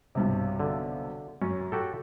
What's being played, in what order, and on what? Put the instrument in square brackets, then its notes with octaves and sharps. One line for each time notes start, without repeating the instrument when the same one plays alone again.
[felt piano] B1 G2 C3
[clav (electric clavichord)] D3
[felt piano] F#2 [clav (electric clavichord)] C#4
[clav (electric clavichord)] F#4 G4 A4